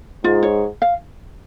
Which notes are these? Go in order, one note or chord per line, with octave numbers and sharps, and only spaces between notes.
G#2 F4
C#5
F5